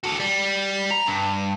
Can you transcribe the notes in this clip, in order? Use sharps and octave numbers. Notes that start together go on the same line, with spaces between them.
F#4 A4
G3
A#5
G2